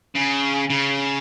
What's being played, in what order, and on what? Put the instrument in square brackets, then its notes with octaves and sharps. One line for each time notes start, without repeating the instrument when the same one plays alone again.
[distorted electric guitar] C#3
C#3